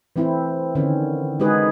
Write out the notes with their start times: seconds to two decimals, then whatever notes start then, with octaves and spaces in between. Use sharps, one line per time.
0.16 E3 A3 C4 E4
0.75 D3 D#3 C4 C#4
1.40 G#3 D#4 F#4 G#4 B4